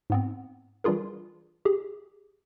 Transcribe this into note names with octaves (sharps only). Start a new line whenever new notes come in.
G#2 B3 C4
E3 G3 D4 F4 G#4 A#4
G4 G#4